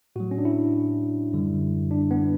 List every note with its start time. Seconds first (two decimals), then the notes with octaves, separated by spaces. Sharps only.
0.16 A2 F#3 F#4
0.31 C#4
0.38 D4
0.45 E4
1.33 F#2 D3 G3
1.91 D4
2.11 B3